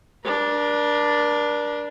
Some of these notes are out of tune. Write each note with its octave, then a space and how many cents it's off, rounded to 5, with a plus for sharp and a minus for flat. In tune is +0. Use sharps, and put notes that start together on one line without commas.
D4 +0 A#4 +40